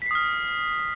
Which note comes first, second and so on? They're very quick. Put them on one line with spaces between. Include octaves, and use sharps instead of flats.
B6 C7 D#6 F6